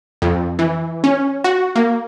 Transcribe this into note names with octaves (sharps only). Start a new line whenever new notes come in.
F2
E3
C#4
F#4
A#3